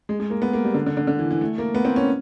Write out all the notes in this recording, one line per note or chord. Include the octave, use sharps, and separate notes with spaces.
G#3
G#3
A#3
B3
A#3
G3
D3
D3
D3
D3
E3
E3
A3
A#3
B3
C4
C#4